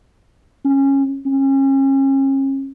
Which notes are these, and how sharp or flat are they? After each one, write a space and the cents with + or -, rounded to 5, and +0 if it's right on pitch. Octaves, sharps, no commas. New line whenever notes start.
C#4 -15
C#4 -35